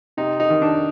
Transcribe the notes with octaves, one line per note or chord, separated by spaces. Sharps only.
C3 D#4
D#4
D#3
D4